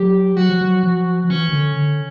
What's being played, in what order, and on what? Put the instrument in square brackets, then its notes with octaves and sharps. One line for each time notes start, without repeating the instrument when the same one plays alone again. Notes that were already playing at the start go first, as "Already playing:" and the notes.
Already playing: [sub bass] F#3 [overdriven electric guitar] G4
[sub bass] F#3 [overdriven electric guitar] F#4
[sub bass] F3
F#3
F3
F3
[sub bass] E3 [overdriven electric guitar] C#4
[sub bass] D#3
D3
D3